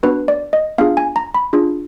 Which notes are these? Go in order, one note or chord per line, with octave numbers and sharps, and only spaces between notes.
B3 D4 F#4 B4
D5
D#5
B3 D4 F4 G#4 F5
G#5
A#5
B5
D4 F4 G#4